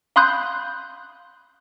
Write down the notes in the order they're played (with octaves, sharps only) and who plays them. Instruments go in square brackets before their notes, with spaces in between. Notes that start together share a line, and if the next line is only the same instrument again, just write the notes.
[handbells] F5 B5 C6 D#6 F#6 G6